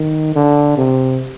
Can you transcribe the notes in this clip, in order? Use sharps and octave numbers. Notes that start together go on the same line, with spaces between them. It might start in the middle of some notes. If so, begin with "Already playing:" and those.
Already playing: D#3
D3
C3